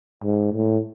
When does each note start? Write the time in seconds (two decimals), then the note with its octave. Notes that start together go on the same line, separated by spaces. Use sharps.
0.23 G#2
0.53 A2